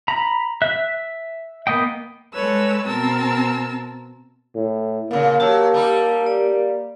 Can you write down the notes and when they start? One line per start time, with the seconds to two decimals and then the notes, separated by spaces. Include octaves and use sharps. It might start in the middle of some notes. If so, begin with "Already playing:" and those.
0.08 A#5 B5
0.62 E5 F#6
1.67 A#3 B3 D#5 G5
2.33 G#3 A4 B4 C#5 E6
2.85 B2 C4 A#4 A5 E6
4.55 A2
5.11 A#2 C#3 A#3
5.40 F#3 G4 A5 E6
5.74 G3 D#4
6.26 D5